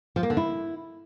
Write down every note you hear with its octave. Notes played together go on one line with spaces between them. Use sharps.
F3
A#3
D3
E4